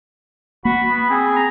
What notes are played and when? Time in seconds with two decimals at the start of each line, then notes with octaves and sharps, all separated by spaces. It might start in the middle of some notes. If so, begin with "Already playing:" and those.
0.65 A#3 F#4 B5
0.89 B3
1.10 C4 G#4
1.36 A#5